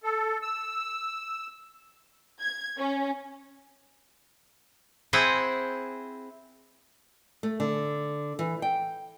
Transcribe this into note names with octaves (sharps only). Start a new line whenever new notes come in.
A4
E6
G#6
C#4
C4 E4 G#4 F#5 G5
A3
D3
E3
G5